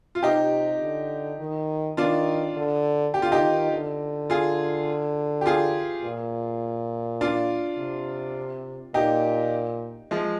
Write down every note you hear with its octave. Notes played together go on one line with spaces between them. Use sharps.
F4
C3 D#4 G4
D3
D#3
D#3 D4 F4
D3
D3 G4
F4
D#4 G4
D#3
D3
F4 G#4
G4
F4 G#4
A#2
D4 F4
C3
A#2 D#4 G4
F3 G#3